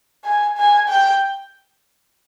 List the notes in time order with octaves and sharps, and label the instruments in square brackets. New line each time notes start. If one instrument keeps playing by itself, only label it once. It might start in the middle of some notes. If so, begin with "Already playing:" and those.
[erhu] G#5
G#5
G5